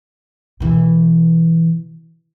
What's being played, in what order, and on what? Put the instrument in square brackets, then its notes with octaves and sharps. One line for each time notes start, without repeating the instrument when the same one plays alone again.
[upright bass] B2 E3